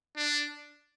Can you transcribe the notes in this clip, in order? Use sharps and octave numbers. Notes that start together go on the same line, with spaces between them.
D4